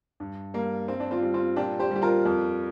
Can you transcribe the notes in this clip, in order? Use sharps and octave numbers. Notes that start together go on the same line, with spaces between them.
G2
G3 A#3
G2 C4
D4
C4 F4
G3
C4 F4
A#2 D4 G4
G4 C5
G3 G4
F4 A#4
F2